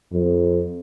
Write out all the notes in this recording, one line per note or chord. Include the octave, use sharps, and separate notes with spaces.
F2